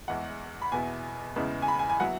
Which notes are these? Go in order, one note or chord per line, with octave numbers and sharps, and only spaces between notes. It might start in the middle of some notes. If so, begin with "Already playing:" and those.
E2 E3 G#3 E4 F#5
B5
E2 B2 B3 E4 G#5
E2 C#3 G#3 B3 E4
G#5
B5
G#5
G#5
F#3 B3 E4 F#5